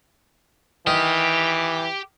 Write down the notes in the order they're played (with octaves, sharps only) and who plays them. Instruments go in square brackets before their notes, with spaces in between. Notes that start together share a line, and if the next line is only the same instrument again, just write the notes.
[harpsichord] D#3 [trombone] E3 [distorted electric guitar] G4